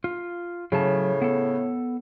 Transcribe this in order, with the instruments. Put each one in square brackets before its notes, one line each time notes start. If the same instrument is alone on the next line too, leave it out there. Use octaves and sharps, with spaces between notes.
[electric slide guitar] F4
[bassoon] A2 [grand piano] C#3 [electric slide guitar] F#3 A5
[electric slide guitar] B3 A4